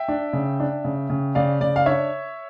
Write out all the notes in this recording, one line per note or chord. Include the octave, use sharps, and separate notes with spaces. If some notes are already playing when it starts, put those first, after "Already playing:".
Already playing: E5 G5
D4
C#3
D4
C#3
C#3
C#3 D5 F5
C#3 D5
F5
D4 C#5 E5